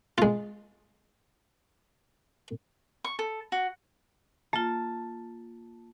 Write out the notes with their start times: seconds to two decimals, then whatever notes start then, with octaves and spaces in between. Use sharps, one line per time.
0.18 G#3 F4
3.05 C#6
3.19 A4
3.52 F#4
4.53 A#3 F4 A5